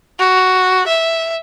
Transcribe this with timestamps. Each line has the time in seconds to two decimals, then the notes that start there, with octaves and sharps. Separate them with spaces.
0.19 F#4
0.88 E5